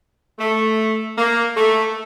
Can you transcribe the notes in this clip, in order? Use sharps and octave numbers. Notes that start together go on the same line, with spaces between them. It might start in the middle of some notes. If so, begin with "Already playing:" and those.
A3
A#3
A3